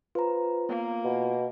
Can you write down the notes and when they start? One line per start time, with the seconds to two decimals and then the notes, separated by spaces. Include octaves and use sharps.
0.15 F4 B4 C5 A#5
0.69 A#3 B3
1.05 B2